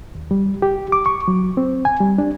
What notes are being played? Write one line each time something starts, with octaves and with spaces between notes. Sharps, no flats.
D#2
G3
G4
D6
C#6
F#3
C4
G#5
G3
D4